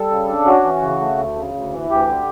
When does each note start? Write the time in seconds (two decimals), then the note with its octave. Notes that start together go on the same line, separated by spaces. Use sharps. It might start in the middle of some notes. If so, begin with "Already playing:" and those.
Already playing: G3 A4
0.11 C#3
0.29 D4
0.46 C#4 F#4
0.64 E3
0.82 C#3
1.00 A3
1.18 D2
1.36 C#3
1.54 D2
1.72 E3
1.89 D2 G4
2.08 D3